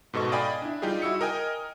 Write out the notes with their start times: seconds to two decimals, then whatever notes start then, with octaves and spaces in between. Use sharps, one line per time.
0.13 G#2 B2 A4 D#5 C#6
0.32 D5 D#5 F5 G5 G#5 B5
0.62 D4 E4
0.82 G3 D#4 F4 G4 G#4
1.02 E4 F#4 E6 C#7
1.21 A#4 D#5 G5 G#5